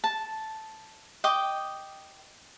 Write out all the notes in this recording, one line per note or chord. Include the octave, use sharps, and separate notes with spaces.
A5
D#5 G5 D6